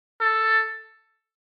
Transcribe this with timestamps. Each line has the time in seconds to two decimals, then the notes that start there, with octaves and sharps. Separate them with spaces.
0.21 A4